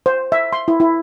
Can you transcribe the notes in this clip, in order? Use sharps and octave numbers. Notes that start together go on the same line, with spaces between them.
C5
E5
C6
E4
E4